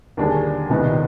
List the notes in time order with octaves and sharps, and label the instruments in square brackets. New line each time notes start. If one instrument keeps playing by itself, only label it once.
[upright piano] D#2 D3 G3 D4 G#4
C2 C3 D#3 B3 D#4